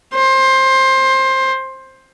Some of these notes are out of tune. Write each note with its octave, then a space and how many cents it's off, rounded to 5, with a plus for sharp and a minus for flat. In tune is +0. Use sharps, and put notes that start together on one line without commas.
C5 +20